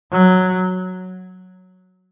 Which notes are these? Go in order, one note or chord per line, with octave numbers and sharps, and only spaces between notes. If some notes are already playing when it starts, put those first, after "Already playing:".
F#3